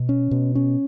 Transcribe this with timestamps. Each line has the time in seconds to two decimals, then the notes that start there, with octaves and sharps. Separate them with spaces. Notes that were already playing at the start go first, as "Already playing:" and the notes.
Already playing: B2
0.09 C#4
0.31 B2
0.55 C#4